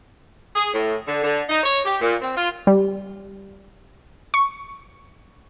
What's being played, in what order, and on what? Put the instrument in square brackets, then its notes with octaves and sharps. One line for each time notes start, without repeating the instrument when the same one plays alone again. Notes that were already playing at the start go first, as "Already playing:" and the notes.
[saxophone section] G#4
A2
D3
D3
D#4
C#5
G4
A#2
C4
F4
[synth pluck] G3
C#6